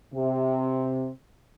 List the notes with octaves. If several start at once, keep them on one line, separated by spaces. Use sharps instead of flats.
C3